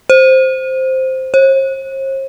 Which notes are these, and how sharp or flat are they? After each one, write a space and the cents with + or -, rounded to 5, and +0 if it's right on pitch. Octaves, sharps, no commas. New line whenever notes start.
C5 +0
C5 +45